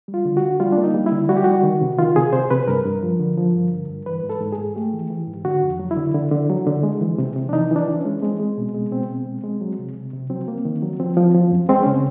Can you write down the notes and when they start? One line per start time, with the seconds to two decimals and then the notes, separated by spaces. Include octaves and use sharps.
0.08 G3
0.14 F4
0.25 D3
0.37 F#4
0.42 D3
0.60 G3 F4
0.72 D4
0.78 A#3
0.83 D#4
0.94 G3
1.06 E4
1.12 D3
1.29 G3 F#4
1.37 G4
1.44 G3 F#4
1.63 D#3
1.81 C3
1.99 D#3 F4
2.16 C3 G#4
2.33 C3 C5
2.51 C3 B4
2.68 G2 A#4
2.85 G2
3.03 F3
3.20 D3
3.37 F3
3.55 G2
3.72 D3
3.89 G2
4.06 E3 B4
4.23 G#2
4.30 A4
4.41 G#2
4.53 G#4
4.58 G#2
4.76 A3 G4
4.93 E3
5.10 E3
5.27 G#2
5.45 D3 F#4
5.63 F2
5.80 F#3
5.91 E4
5.97 D3
6.15 D3
6.32 D3
6.49 F#3
6.66 D3
6.83 G#3
7.01 E3
7.18 C3
7.36 C3
7.49 D4
7.53 E3 D#4
7.71 E3 D4
7.88 E3
7.99 C#4
8.05 G#3
8.22 G#3 C4
8.40 G#3
8.57 B2
8.74 G#3
8.92 B2 C4
9.09 B2
9.26 G#3
9.44 G#3
9.61 F#3
9.79 C3
9.96 C3
10.13 C3
10.30 F#3 C4
10.48 A#3
10.65 D#3
10.82 F#3
11.00 F3 C4
11.17 F3
11.34 F3
11.52 F#2
11.69 G#3 C4
11.82 C#3 C#4
11.95 C4